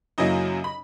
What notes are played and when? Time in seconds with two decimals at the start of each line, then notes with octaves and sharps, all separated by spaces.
0.18 F#2 C#3 F#3 A#3 E4 D#5
0.64 B5